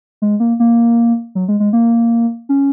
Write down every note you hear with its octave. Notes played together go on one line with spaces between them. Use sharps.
G#3
A#3
A#3
F#3
G#3
G#3
A#3
C#4